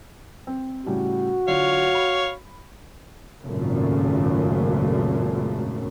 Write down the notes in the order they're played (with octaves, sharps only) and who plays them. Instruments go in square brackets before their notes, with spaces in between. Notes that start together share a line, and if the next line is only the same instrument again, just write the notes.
[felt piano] C4
[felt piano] A2 C#3 G3 [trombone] F#4
[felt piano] D3 F#3 F4 [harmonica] C#5 F5
[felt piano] B5
[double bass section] G#1 C#2 F#2 A#2 C#3 A3